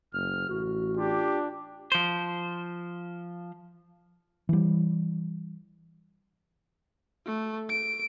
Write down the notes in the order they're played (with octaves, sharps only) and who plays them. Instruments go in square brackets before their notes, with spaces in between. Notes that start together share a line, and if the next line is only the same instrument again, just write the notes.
[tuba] F#1 [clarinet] F6
[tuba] A1 [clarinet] F#4
[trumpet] D4 [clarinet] F4 [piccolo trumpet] G4
[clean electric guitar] F3 C5
[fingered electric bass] E3 G3
[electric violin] A3
D7